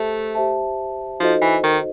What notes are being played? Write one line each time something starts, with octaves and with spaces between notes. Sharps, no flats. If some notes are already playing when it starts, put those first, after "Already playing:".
Already playing: A3 G4 C5 E5 A5
G4 C5 E5 A5
F3 D#4 F#4 A4 C5 D#5
E3
D#3